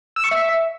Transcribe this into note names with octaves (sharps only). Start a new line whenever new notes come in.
E6
C#6
E5